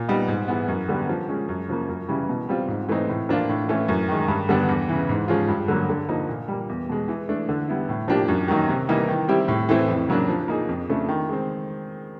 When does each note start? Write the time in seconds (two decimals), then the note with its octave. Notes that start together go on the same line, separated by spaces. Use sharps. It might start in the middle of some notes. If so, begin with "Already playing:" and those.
Already playing: A#2
0.09 G3 B3 D#4
0.28 G#2
0.48 E3 G#3 B3
0.68 F#2
0.88 D3 G3 B3
1.09 F3
1.28 G#3 C#4
1.49 F#2
1.68 C#3 F3 A#3
1.89 F#2
2.08 C#3 E3 G3
2.29 B2
2.49 G3 C4 F4
2.68 G#2
2.89 E3 A3 C4 D#4
3.09 A2
3.29 F3 A#3 D4 F4
3.49 A2
3.69 E3 A3 C#4
3.88 F#2
4.08 D#3 G#3
4.28 G2
4.49 D3 G3 B3 D4
4.68 E2
4.89 C#3 E3
5.09 G#2
5.28 F3 G#3 C#4 F4
5.48 G2
5.68 D3 F#3 A#3
5.89 D3
6.09 F3 A#3 D#4
6.29 A#2
6.48 G3 A#3
6.69 E2
6.89 B2 G#3
7.08 E3
7.29 A3 D4
7.49 D3
7.68 G3 B3 E4
7.89 A2
8.08 F3 A#3 D4 G4
8.28 F#2
8.48 D#3 F#3 A#3 D#4
8.69 C3
8.89 E3 G3 A#3 D#4
9.09 D#3
9.28 G3 C4 E4 G4
9.48 A2
9.69 E3 A3 C4 E4
9.88 F2
10.08 C#3 F#3 A#3 D4
10.29 F3
10.48 A#3 D#4 G#4
10.69 F2
10.89 C#3 F3 A3 D4
11.08 D#3
11.29 G#3 C4